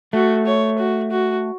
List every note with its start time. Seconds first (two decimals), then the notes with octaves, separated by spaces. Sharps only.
0.13 A3 F#4
0.46 C#5
0.79 F#4
1.11 F#4